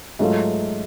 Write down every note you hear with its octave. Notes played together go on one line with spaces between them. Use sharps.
G#2 F#3 A3 F4 A4